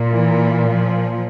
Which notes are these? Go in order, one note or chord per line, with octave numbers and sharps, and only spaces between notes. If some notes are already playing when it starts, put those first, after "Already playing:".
Already playing: A#2
E3
F3